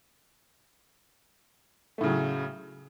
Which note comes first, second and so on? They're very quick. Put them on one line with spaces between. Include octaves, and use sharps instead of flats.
A3 A2 C#3 F#3